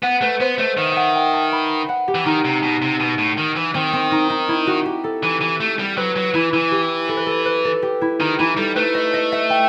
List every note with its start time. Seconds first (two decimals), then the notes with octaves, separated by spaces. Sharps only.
0.03 B3 F#5
0.21 A3 B4
0.40 B3 C5
0.58 A3 D#5
0.77 D#3 E5
0.92 E5 F#5
1.15 G5
1.33 A5
1.52 B5
1.89 F#5
2.08 G4
2.15 E3
2.26 D#3 D#4
2.45 C3
2.63 B2
2.82 C3
3.00 B2
3.18 A2
3.38 D#3
3.56 E3
3.74 D#3 C4
3.93 C4
4.12 D#4
4.30 D#4
4.48 E4
4.67 F#4
4.86 G4
5.04 A4
5.23 E3
5.41 E3
5.60 A3
5.79 G3
5.97 F#3 B4
6.16 F#3
6.34 E3 E4
6.52 E3 E4
6.72 G4
7.09 A4
7.17 B4
7.26 A4
7.45 B4
7.65 A4
7.82 G4
8.01 E4
8.20 D#3 D#4
8.39 E3 E4
8.57 G3 A4
8.76 A3 B4
8.94 D#5
9.13 D#5
9.32 E5
9.50 G5